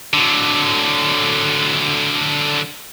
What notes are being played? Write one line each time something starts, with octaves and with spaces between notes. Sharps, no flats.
D3 F#3